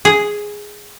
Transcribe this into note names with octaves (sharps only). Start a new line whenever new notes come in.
G#4